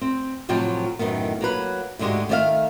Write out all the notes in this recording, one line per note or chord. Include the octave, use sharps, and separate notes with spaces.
C4
A2 C3 F3 F#3 G5 A5
F#2 A2 D#3 B3
F#3 A#3 B4
D2 G#2 D3 G#3 F#4 G4
D#3 A3 B4 D5 E5 F5